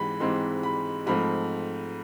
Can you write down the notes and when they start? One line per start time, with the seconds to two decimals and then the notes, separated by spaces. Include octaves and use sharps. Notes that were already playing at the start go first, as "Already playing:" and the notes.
Already playing: G#2 E3 G#3 C4 B5
0.20 G#2 E3 G#3 C4 C6
0.63 B5
1.07 G#2 F3 A3 C4 B5